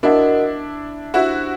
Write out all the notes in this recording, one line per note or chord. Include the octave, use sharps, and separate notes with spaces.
D4 E4 F#4 A#4 D#5 F#5
D4 E4 F#4 G4 C5